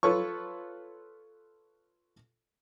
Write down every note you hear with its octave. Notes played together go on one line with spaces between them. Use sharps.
F4 A4 B4 C#5 C#6